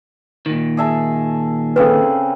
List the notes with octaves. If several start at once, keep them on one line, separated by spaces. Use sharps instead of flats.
A#2 D#3
G#4 E5 A5
C#3 C4 A4 B4